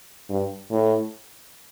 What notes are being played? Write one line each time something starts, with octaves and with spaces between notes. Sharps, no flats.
G2
A2